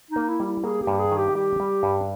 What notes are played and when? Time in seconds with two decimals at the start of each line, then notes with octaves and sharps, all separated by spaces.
0.11 D#4
0.16 A#3
0.28 E4
0.40 G3
0.46 E4
0.64 A#3 G#4
0.82 G4
0.87 G2
0.99 G#4
1.11 D#3
1.17 G4
1.35 G3 G4
1.60 G3
1.83 G2